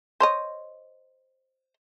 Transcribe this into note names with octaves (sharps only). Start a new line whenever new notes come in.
C5 C#5 D#5